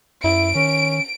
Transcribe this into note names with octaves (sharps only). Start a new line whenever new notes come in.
F#2 E4 D7
D#3 C#4